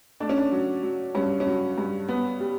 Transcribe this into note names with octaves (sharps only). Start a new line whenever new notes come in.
A3 D4
C#4
D4
F#3
F#3
G2 C#4
C#4
F#3
G2
B3
G3